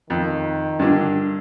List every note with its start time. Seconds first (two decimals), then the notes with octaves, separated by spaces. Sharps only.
0.10 F2 D#3
0.79 G2 D3